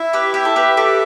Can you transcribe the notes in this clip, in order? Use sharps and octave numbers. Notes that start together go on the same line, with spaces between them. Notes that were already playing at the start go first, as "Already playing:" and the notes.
Already playing: E4 E5
G4 B4
G4 E5
A4
G4 B4
G4 A4 B4